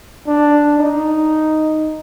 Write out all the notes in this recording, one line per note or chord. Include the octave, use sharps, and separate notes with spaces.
D4
D#4